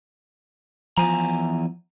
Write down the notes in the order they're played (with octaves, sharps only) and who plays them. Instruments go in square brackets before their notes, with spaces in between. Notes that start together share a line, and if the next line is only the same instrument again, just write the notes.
[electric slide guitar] E2 G#5 A#5 [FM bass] F3